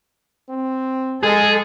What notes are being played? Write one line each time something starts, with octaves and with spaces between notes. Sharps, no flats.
C4
G#3 G#4 A4